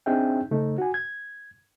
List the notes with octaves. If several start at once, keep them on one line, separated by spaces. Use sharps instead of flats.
C4 D4 D#4 G#4 E5 G5
C#3 A3 D#4
F#4 G#5
G#6